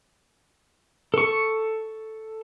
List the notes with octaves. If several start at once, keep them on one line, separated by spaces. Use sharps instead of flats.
A4 C#6